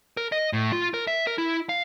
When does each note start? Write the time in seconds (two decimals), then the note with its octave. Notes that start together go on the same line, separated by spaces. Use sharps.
0.17 A#4
0.32 D#5
0.53 A2
0.72 F4
0.94 A#4
1.07 E5
1.27 A#4
1.38 E4
1.69 F5